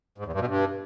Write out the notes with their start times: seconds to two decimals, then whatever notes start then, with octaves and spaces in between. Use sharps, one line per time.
0.18 G#2
0.25 E2
0.33 G2
0.40 B2
0.47 G2